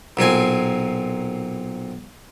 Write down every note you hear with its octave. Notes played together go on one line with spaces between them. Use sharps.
B1 A#2 C4 G#5